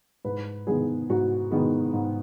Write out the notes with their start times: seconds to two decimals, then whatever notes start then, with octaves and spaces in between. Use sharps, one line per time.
0.25 G#2 B4
0.67 D#3 G#3 B3 G#4
1.09 G#2 F#4
1.51 D#3 G#3 B3
1.93 G#2